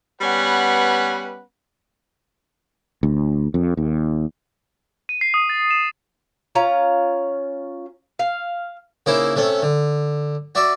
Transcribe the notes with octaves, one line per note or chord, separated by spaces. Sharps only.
G3 B3 C#4 B4 F#5
D2
F2
D#2
D#7
C7
D#6
A6
E7
C#4 F4 A#5
F5
C#3 A#3 D#4 E4 C5
C3 A3 C#4
D3
F#4 D5 E5